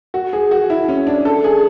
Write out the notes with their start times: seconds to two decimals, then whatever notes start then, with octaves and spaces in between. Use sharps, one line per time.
0.14 F#4
0.33 G#4
0.51 F#4
0.70 E4
0.88 C#4
1.07 D4
1.25 A4
1.44 G#4